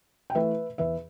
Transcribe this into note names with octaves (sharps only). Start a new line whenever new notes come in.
G5
E3 A3 B4 E5
E2 B4 E5